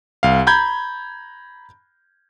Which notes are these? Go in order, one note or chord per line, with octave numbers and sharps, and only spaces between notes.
C2 F5
A#5 B5 G6 G#6